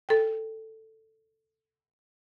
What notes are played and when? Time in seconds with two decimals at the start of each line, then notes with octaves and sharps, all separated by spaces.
0.09 A4 G5